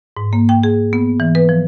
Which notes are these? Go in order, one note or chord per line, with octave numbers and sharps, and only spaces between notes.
G#2
A#3
G5
G#4
B3
E3
B4
F3